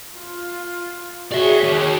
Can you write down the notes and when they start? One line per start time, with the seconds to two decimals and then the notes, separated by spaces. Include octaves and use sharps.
0.15 F4
1.32 F#4 G#4 C#5 D5 E5
1.64 D#2